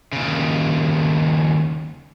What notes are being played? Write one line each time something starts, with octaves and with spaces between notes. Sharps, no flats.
D#2 C#3